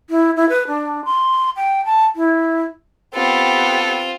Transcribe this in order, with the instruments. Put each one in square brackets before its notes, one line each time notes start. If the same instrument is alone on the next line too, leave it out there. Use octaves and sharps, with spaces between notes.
[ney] E4
E4
B4
D4
C6
G5
A5
E4
[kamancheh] B3 G4 [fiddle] C4 F4 [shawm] A4